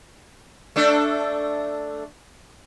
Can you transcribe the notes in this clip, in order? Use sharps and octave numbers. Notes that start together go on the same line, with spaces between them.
A3 D4 A4